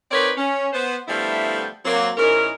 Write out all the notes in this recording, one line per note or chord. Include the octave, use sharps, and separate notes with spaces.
C4 D#4 A#4 B4 C#5 D5
C#4
B3 C5
D3 F3 G3 A3 B3 E4
F#3 A#3 C4
G#2 E3 C#4 D#4 A#4